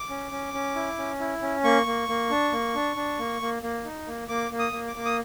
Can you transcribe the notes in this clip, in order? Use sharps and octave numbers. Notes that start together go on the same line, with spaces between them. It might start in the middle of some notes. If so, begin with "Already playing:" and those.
Already playing: D6
C#4
C#4
C#4
E4
C#4
E4
C#4
A#3 C#6
A#3
A#3
D4
A#3
D4
D4
A#3
A#3
A#3
D#4
A#3
A#3 D6
A#3
D#6
A#3
D6
A#3
D#6